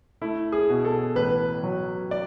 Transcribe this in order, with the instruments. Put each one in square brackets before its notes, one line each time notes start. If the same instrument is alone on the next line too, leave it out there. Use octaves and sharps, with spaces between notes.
[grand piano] A3 E4
G#4
B2
A4
A1 B4
F#3
D5